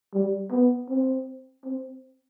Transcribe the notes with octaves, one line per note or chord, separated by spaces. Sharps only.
G3
B3
C4
C4